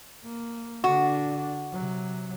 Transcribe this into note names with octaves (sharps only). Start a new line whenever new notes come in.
A#3
D3 D4 F#4
C3 F#3